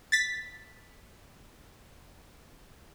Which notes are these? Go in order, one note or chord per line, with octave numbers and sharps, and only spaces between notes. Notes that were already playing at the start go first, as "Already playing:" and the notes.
A6 B6